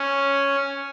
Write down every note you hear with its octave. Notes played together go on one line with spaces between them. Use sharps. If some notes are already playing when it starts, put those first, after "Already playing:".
Already playing: C#4